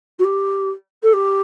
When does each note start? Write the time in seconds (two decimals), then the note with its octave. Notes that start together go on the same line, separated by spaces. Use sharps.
0.19 F#4
0.24 G4
1.03 A4
1.13 G4